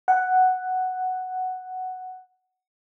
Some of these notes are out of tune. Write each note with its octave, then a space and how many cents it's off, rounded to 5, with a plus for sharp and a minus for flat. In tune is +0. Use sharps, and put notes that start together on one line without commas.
F#5 +5